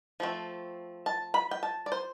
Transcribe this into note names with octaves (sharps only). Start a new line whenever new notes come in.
F3 A3 C4
A5
B5
G5
A5
D5
C5